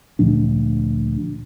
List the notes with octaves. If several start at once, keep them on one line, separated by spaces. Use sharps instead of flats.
D2 A#2 F3 D4